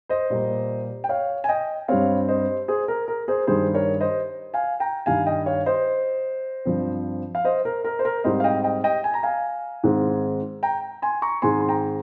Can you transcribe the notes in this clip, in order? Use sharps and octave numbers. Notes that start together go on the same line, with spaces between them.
C5 D#5
A#2 G3 A#3
G5
C#5 F5
G#5
D#5 G5
G2 G3 C4 C#5 F5
C5 D#5
G#4 C5
A#4
A#4
G#4 C5
G2 D#3 G3 G#4 C5
A#4 C#5
C5 D#5
F5 G#5
G5 A#5
G2 D#3 G3 F5 G#5
D#5 G5
C#5 F5
C5 D#5
G2 F3 C4
F5
C5 D#5
A#4
A#4
C5
A#4
G#2 G3 C4 C5 D#5
F5
D#5 G5
D#5 G5
D#5 G5
G#5
A#5
F5 G#5
G#2 D#3 G#3 C4
G5 A#5
G#5 C6
A#5 C#6
G#2 D#3 G#3 C4 G#5 C6
C6
G5 A#5